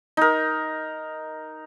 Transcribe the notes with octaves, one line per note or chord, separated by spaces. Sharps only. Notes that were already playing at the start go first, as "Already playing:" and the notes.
D#4 A#4